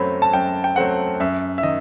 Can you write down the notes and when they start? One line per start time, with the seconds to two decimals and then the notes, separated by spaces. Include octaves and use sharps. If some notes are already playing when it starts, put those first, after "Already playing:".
Already playing: F#2 F#3 A3 C4 B5
0.22 A5
0.33 F#2 G5
0.64 G5
0.76 F#3 A3 C4 F#5
1.20 F#2 E5
1.58 E5
1.63 D#3 D#5